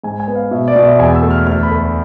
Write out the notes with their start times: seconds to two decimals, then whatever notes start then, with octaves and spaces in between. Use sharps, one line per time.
0.04 G#2 G#5
0.20 G#5
0.28 B3
0.35 F5
0.51 B2 E5
0.68 D5
0.75 B2
0.83 E5
0.99 E2 G#5
1.15 E6
1.22 A3
1.31 F6
1.46 D2 F6
1.63 B5
1.71 A3
1.79 B5